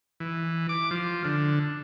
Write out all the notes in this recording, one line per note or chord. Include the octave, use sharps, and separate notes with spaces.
E3
D6
F3
D3